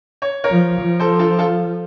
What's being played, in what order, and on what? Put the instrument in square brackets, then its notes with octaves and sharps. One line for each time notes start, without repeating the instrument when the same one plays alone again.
[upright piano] C#5
A#4 C#5
[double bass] F3
F3
[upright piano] A4 C5
F4 A4
F4 A4